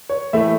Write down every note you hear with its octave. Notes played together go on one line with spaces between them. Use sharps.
C#5
A2 E3 A3 E5